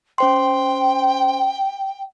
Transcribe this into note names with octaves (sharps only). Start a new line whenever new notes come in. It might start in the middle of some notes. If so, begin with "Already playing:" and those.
C#4 C5 G5 C6